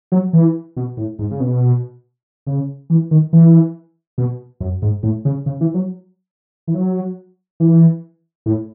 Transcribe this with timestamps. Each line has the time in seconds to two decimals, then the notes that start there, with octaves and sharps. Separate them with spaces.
0.12 F#3
0.33 E3
0.77 B2
0.97 A2
1.19 G#2
1.31 C#3
1.40 B2
2.47 C#3
2.90 E3
3.11 D#3
3.33 E3
4.18 B2
4.60 F#2
4.82 G#2
5.03 A2
5.25 C#3
5.46 C#3
5.61 E3
5.74 F#3
6.68 E3
6.74 F#3
7.60 E3
8.46 A2